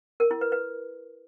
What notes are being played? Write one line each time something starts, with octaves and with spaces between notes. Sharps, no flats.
A#4
E4
B4
B4